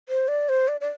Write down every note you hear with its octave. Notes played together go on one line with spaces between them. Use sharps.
C5
D5
C5
D5
D5